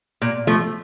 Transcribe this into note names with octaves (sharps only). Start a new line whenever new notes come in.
A#2
F3 A3